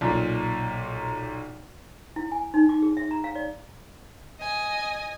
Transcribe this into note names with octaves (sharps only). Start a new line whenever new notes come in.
B1 A#2
E4
G#5
D#4
D6
G#4
E5
A#5
F5
D5
D#5 G#5